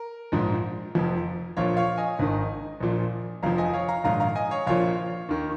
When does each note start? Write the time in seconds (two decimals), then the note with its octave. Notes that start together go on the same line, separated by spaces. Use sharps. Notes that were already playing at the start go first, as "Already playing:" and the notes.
Already playing: A#4
0.32 A#1 G#2 F3
0.95 F1 F2 F3
1.57 A#1 A#2 F3 C#5 F5
1.77 C#5 F5
1.97 D#5 G#5
2.19 G#1 G#2 D#3
2.80 A#1 A#2 F3
3.43 F1 F2 F3 F5 A#5
3.58 D#5 G#5
3.73 C#5 F5
3.88 F5 A#5
4.04 A#1 G#2 D#3 F5 A#5
4.20 F5 A#5
4.35 D#5 G#5
4.51 C#5 F5
4.67 A#1 A#2 F3 C#5 F5
5.29 D#2 D#3